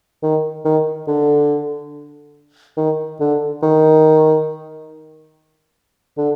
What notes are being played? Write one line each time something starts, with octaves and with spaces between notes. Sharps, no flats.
D#3
D#3
D3
D#3
D3
D#3
D3